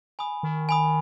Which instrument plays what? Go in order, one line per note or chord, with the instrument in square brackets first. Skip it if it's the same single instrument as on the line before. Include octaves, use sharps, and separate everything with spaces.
[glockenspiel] G#5 B5 D#6
[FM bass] D#3
[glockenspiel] G#5 B5 D#6